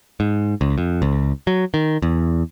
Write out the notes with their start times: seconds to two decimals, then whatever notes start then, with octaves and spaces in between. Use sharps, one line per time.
0.20 G#2
0.61 C#2
0.78 F2
1.02 C#2
1.47 F#3
1.74 D#3
2.02 E2